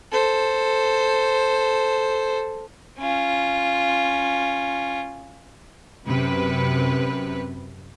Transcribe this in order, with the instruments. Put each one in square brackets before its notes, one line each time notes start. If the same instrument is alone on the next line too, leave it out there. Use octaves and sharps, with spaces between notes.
[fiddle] A4 C5
C#4 F4
[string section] F#2 C3 B4